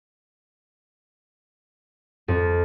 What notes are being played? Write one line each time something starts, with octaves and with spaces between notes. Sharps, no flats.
F2